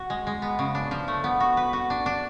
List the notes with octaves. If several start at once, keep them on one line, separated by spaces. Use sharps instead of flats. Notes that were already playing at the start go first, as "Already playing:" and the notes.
Already playing: F#4
G#3
G#3
B3
C#3
D4
F3
A3
B3
F#4
B4
F#4
D4
D4